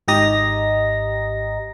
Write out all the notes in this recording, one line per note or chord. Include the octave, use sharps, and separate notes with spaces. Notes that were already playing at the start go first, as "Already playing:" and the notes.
G#1 G#2 G4 D#5 A#5 A#6